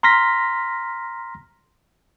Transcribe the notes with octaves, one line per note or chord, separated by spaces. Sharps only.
A#5 C6 F6 A#6 B6